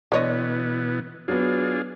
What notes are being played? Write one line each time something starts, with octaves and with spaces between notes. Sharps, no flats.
B2 D3 E3 B3 C#5 D#5
F#3 B3 D4 F4 G#4